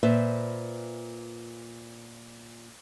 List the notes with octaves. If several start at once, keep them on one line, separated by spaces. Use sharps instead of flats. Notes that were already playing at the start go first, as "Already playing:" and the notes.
A#2 B4 C5 E5